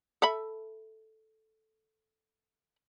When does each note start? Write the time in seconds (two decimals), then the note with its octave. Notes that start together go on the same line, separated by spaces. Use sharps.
0.22 A4 E5 B5